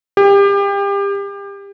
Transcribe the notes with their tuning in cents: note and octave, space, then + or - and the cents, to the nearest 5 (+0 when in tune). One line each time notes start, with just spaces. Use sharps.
G4 +30